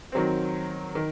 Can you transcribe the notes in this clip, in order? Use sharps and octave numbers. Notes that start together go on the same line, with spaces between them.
D#3 F#3 C4
D#3